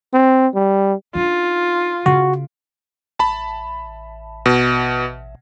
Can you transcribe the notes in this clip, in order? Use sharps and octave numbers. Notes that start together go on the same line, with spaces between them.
C4
G3
D4 D#4 F4
C#3 F#4
A1 A5 B5
B2